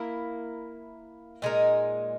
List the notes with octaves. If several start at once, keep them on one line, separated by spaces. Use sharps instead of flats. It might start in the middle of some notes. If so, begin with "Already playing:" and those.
Already playing: A#3 E4 A#4
A#2 G#3 D#4 A#4